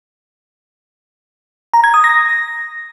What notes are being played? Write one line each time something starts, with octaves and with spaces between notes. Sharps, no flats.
A#5
G#6
D#6
A#6